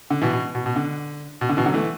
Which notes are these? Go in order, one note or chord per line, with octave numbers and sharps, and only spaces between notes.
D3
B2 E3
B2
B2
B2
D3
B2
D3
B2 E3
D3 F#3
E3 A3